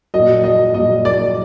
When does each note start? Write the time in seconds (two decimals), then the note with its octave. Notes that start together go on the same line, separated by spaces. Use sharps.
0.14 A#2 F#3 D#5
0.44 D#5
0.74 A#2 F#3 D#5
1.05 D5